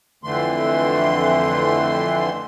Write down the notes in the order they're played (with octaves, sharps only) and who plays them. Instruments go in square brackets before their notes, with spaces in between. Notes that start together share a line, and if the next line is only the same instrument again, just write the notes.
[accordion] F2 D3 E3 A3 C6